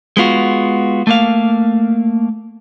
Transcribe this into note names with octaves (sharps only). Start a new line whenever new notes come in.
G#3 B3 F4 F#4
A3 A#3 F5